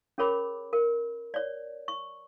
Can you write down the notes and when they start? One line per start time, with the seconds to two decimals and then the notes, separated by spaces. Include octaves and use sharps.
0.18 C#4 G#4 A#4 C#5 B5 D6
0.73 A#4
1.34 C#5 D5
1.88 C#6